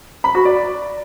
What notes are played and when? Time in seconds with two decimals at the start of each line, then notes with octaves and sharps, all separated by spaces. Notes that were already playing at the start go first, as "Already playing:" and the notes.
0.24 B5
0.35 F#4
0.45 D5